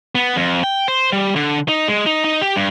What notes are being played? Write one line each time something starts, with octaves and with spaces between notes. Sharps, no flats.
B3
F2
G5
C5
G3
D3
D#4
G#3
D#4
D#4
G4
G2